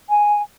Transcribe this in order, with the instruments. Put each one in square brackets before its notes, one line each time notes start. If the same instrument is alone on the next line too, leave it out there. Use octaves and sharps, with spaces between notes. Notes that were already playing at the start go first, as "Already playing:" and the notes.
[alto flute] G#5